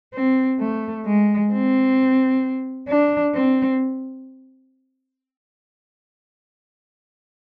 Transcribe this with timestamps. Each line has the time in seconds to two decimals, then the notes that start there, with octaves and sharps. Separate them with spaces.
0.14 C4
0.60 A3
1.05 G#3
1.52 C4
2.88 D4
3.34 C4